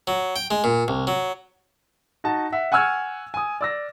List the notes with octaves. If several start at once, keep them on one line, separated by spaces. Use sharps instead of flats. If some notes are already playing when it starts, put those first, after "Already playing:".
F#3
G5
G#3
A#2
C2
F#3
D#4 F#4 A5
E5 F#5
F#5 G#5 C#6 E6 F6 G#6
G#5 D#6
D5 E6 A#6